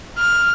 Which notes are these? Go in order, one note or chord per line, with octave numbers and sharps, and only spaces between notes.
F6